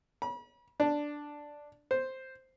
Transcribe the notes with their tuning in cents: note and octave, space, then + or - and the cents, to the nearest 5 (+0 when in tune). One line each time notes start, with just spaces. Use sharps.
B5 -40
D4 +0
C5 +0